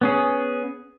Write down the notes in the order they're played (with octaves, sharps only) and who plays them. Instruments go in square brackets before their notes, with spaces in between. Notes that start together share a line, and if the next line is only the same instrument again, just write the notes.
[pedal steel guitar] B3 C#4 G#4